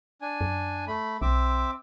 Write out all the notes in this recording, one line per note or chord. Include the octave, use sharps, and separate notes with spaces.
D4 G#5
F#2
A3 B5
B1 C4 E5 D6